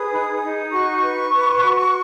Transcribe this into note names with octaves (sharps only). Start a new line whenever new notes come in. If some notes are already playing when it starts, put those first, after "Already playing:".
Already playing: G#4 B4 D#6
D#4
D#4
F#4 C#6
B4
B4
F#4